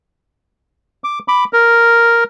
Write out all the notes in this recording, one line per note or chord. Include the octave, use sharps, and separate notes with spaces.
D6
B5 D6
A#4